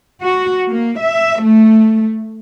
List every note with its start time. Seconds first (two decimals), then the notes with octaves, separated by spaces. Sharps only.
0.22 F#4
0.70 A#3
1.01 E5
1.43 A3